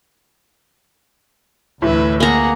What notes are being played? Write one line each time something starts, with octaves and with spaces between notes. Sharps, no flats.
D2 A2 E3 B4 E5
A#3 G#4 F#5 A#5